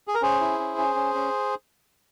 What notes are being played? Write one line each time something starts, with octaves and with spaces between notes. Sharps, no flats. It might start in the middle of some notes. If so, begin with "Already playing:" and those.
G#4
A#4
C#4 G#4 C5
E4
C#4
C#4
C#4
C#4